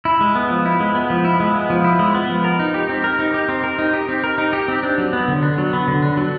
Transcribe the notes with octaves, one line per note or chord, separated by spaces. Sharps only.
E4
G#3
B3
F3
E4
G#3
B3
F3
E4
G#3
B3
F3
E4
G#3
B3
F3
A#4
D#4
G4
C4
A#4
D#4
G4
C4
A#4
D#4
G4
C4
A#4
D#4
G4
C4
D4
F#3
B3
D3
D4
F#3
B3
D3
D4
F#3